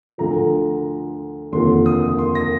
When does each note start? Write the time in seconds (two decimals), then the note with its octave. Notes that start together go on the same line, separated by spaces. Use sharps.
0.18 D2 D3 F3 A#5
1.52 F1 D#2 D3 F3 C6
1.86 D#6
2.19 C6
2.35 A#6